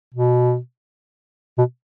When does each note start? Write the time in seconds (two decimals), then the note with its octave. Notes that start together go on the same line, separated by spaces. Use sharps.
0.14 B2
1.58 B2